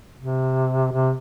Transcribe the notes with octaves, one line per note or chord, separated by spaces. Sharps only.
C3
C3